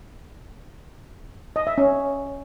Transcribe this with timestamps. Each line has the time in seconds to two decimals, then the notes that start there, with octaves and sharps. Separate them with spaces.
1.56 D#5
1.67 E5
1.78 C#4